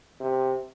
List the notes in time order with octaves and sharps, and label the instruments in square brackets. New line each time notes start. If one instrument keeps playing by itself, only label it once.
[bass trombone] C3